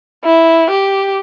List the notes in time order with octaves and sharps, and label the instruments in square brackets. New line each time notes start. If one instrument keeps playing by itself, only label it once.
[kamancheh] E4
G4